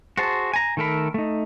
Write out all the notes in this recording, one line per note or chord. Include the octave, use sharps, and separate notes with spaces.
F#4 G#4 C5 A5
G#5 A#5
D#3 A3 A4 A#4 B5
A3 D#4